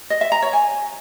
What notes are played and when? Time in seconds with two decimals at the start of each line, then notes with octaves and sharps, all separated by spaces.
0.10 D#5
0.21 E5
0.32 A#5
0.42 C#5
0.53 G#5